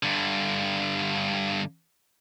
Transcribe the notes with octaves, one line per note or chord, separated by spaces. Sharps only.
G2 D3